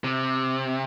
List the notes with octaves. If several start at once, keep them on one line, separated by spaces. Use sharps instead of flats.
C3